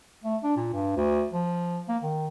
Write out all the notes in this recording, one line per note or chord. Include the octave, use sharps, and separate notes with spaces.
A3
D4
A#2
G2
D2
F3
A#3
D#3